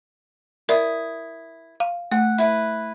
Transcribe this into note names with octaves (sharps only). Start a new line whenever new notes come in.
E4 A#4 D5 D#6
F5
A3 F#5
E4 B4